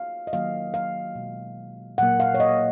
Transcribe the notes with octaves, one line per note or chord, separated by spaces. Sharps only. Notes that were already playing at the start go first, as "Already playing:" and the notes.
Already playing: F5
D#5
D#3 F#3 A#3 F5
F5
B2 G#3
A#2 F#3 A#3 F#5
F5
C#5
D#5